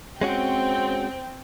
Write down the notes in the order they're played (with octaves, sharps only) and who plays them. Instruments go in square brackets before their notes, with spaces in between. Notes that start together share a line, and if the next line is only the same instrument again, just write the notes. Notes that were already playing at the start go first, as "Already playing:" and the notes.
[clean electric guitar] G#3 C#4 F#4 [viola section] C4 [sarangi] G5